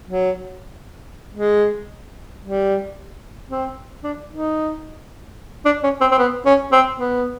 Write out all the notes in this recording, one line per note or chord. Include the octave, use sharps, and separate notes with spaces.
F#3
G#3
G3
C4
D4
D#4
D4
C#4
C4
C4
B3
C#4
C4
B3